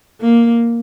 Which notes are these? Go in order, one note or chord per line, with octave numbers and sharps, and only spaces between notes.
A#3